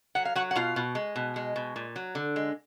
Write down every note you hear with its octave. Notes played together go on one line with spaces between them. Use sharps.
F#3 F#5
F5
F#3 F#4 F#5
F#5
B2 F4 F5
B2
G#3
B2
G#3
B2
A#2
F#3
D3
G#3